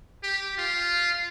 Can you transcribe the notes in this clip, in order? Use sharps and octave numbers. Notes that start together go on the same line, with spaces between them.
G4
F4